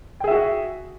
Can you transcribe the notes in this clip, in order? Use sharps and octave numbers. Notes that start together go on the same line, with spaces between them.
F#4 G#4 E5 G5